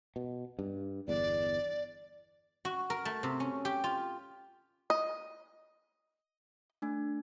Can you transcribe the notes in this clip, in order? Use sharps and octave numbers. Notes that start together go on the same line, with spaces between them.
B2
G2
G1 E2 D5
F#4
A#4
A3
C3
C#4
G4
F4
D#5
A3 D4 G#5